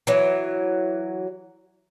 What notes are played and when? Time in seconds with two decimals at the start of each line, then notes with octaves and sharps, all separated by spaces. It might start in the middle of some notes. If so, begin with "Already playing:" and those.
0.07 E3 F#3